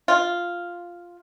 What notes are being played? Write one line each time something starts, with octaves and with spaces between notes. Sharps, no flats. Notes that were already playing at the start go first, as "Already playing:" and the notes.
F4